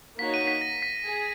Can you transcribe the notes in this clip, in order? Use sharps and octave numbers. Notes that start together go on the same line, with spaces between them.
A#3 D#4 F#4 C#5 B6
D#7
B6
A#6
B6
G#4